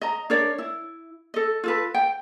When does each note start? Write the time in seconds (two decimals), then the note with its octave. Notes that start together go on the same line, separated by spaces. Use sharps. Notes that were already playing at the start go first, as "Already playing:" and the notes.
0.01 D#5 A#5
0.30 D4 A#4 C#5 D5
0.58 E4
1.34 A4 D#5
1.64 F4 A4 B4
1.94 G5